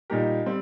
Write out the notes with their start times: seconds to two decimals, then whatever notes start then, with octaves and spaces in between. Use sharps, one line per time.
0.10 A#2 G3 D#4 G4 A#4
0.46 G3 C4